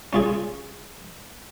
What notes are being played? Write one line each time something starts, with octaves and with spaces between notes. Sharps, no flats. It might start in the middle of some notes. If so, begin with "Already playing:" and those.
C#4 F4 G#4